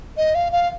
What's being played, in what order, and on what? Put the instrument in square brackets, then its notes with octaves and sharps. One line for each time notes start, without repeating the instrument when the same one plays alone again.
[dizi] D#5
F5
F5